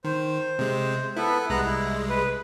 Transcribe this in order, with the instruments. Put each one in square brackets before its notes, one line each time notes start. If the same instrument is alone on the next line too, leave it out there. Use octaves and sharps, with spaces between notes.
[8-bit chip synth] D#3 [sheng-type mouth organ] C5
[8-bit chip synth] C3 G#3
[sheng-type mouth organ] B3 A4 B4 [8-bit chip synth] E4
[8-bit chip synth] C2 G#3 [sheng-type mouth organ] B3 A#5 F#6
[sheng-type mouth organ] E4
B4